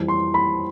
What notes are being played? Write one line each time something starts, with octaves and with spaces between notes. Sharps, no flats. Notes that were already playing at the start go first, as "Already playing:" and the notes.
Already playing: F2 E3 G3
C6
B5